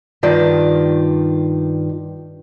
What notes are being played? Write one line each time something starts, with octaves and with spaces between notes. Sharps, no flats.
G2 D#3 F4 D5